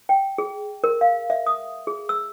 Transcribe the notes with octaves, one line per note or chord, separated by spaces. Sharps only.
G5
G#4
A#4
F5
E5
D#6
G#4
E6